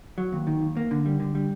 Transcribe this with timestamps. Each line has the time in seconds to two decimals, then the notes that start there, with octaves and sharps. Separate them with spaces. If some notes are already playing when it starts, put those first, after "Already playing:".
0.18 F#3
0.33 D#2
0.47 D#3
0.62 D#2
0.77 A#3
0.91 D3
1.06 G3
1.20 D3
1.35 G3